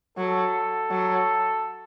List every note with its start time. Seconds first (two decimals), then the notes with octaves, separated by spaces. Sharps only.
0.18 F#3 A4
0.91 F#3